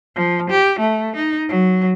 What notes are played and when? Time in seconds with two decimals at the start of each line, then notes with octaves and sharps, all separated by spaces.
0.16 F3
0.50 G4
0.80 A3
1.16 D#4
1.49 F#3